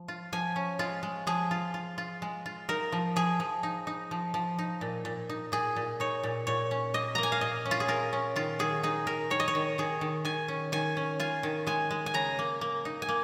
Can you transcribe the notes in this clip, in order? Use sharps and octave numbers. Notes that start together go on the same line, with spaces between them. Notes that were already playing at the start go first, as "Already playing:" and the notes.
Already playing: F3
F4
F3 G#5
C#4
G#3 F4
G#3
F3 G#4
F4
F4
F4
G#3
F4
D#4 A#4
F3
F3 G#4
F3
D#4
D#4
F3
F3
D#4
A#2
A#2
D#4
A#2 G#4
A#2
D#4 C#5
A#2
A#2 C#5
C#4
A#3 D#5
A#3 A#5
G#5
F5
A#2 D#5
C#4
F4
G#4
F4 A#4
C#4
D#3 F4
D#3 G#4
D#4 G#4
D#3 A#4
D#3 C#5
D#5
C#5
D#3
D#3 G#4
D#3
D#3 G#5
C#4
D#3 G#5
C#4
F4 G#5
D#3
G#3 G#5
G#3
G#5
C#3 A#5
A#3
A#3
D#4
G#5
A#3